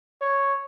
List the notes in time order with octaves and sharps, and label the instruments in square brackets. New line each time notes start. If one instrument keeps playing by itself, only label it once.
[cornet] C#5